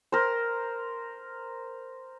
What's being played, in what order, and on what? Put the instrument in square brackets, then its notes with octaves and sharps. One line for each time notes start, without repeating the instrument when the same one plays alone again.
[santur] A#4 C5